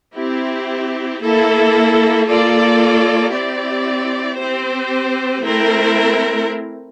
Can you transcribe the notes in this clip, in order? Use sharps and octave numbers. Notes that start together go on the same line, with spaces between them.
C4 E4 G4
A#3 E4 A4
A#3 F4 A4 D5
C4 E4 G4 D5
C4 G4 C5
A3 C4 E4 A#4